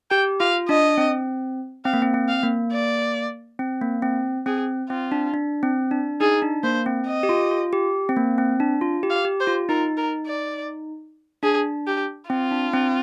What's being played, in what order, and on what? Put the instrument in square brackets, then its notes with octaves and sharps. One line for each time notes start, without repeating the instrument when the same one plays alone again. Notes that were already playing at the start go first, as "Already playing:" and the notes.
[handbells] G4 [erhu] G5
[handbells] F4 [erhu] F5
[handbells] D4 [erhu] D#5
[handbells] C4
[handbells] C4 [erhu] F5
[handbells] A#3
C4
C4
[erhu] F5
[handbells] A#3
[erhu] D5
[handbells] C4
A#3
C4
[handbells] C4 [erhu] G#4
[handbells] C4 [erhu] F4
[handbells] D4
D4
C4
D4
[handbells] D#4 [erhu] G#4
[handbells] D4
[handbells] A#3 [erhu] C5
[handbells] C4
[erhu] D#5
[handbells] G4
F4
F4
G4
C4
A#3
C4
D4
F4
G4
[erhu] F5
[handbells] G4
[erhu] C5
[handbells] F4
[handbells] D#4 [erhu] A#4
[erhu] A#4
D5
[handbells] D4 [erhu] G#4
[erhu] G4
[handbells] C4 [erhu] F4
[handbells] D4
C4